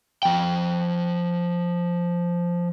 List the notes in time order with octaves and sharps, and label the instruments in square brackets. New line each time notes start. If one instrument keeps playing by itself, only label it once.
[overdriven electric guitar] F3 G5